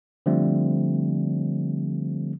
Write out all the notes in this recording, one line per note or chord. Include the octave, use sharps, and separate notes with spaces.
D3 F3 G3 A3 C4